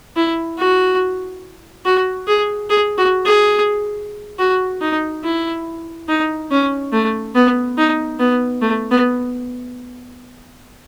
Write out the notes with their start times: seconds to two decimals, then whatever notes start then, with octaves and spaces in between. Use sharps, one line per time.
0.16 E4
0.58 F#4
1.85 F#4
2.27 G#4
2.70 G#4
2.98 F#4
3.26 G#4
4.39 F#4
4.81 D#4
5.24 E4
6.09 D#4
6.51 C#4
6.93 A3
7.35 B3
7.78 D#4
8.20 B3
8.62 A3
8.91 B3